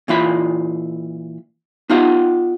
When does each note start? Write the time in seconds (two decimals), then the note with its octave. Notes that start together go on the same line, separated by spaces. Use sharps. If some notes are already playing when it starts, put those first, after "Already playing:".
0.08 A#2 E3 F4 B5
1.90 B3 D#4 F4 G4 F5 F#5